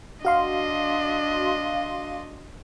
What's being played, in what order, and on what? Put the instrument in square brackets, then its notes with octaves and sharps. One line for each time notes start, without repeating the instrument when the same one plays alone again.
[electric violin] D4 D#5 [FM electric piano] F#4 F5 C6